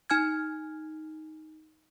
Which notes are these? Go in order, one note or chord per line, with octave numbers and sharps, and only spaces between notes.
D#4 G#5 F6 G#6